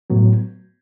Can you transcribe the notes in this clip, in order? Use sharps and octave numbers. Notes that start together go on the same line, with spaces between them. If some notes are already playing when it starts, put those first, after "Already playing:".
A2 F#3 B3